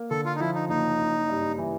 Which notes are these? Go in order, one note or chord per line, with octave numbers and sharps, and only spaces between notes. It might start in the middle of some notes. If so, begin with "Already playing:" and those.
Already playing: A#3
D3 A4
F4
D#4
F3 E4
D#4
F#1 D#4
F#1
G2
E3